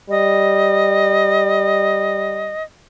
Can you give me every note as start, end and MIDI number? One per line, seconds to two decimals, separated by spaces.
0.10 2.55 55
0.10 2.63 75